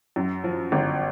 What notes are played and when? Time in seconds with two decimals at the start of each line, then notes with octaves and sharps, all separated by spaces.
0.16 F#2
0.44 F3
0.72 G1